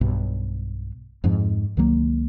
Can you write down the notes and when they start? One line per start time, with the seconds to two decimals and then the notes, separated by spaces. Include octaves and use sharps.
0.01 B1 G2 B2
1.24 F2 G#2 F3
1.77 C#2 D#3 F#3 A#3